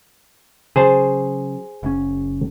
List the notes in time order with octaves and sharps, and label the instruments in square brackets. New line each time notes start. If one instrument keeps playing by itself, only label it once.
[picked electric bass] C#3 F#3 [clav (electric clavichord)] G#4 C5 A5
[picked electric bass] F#1 A2 C#4